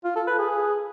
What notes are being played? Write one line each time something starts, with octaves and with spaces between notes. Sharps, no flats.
F4
A4
B4
G#4